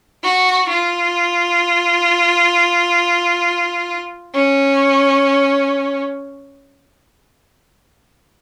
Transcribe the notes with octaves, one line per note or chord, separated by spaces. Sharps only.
F#4
F4
C#4